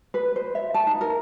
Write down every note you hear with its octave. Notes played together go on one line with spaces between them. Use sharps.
B4
C5
E5
A5
D#4
A#4